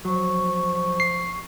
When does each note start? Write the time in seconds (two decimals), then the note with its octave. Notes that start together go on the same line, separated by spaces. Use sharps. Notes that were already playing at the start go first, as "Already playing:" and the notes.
0.05 F3 F#3 C#6
1.00 C7